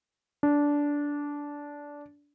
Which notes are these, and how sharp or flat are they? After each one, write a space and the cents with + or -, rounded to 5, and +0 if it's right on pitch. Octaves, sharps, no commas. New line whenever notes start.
D4 -15